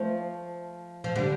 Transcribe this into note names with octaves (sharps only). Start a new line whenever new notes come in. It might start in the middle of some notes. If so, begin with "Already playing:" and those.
Already playing: F3 A3
F3
D3 G3